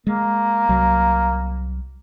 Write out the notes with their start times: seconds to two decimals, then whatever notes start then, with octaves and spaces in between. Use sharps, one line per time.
0.07 G#3 A#3
0.69 C2 F#3